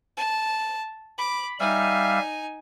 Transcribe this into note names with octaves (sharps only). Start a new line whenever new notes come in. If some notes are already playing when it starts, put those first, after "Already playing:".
A5
B5 D6
G3 D#4 E5 F5 G#5